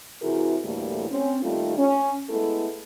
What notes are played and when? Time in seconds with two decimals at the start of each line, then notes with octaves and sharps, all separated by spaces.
0.22 C3 E3 E4 F#4 G#4 A#4
0.64 D2 A2 E3 G3 A3 A#3
1.10 C4 C#4
1.43 D#2 D#3 G3 A3 F4
1.78 C#4
2.29 G#3 A3 B3 E4 A4